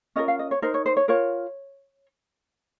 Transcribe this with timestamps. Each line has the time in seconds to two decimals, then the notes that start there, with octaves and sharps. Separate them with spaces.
0.16 C#4 F4 A#4 D#5
0.28 F5
0.39 D#5
0.51 C#5
0.62 D#4 A#4 C5
0.74 C#5
0.86 C5
0.97 C#5
1.08 F4 A#4 C#5